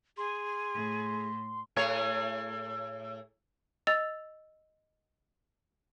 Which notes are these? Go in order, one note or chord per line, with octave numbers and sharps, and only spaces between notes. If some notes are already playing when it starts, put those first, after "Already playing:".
G#4 C6
A2
A2 G#4 C#5
D#5 E6 A6 F7